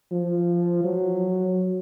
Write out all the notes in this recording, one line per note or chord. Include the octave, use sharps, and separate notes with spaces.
F3
F#3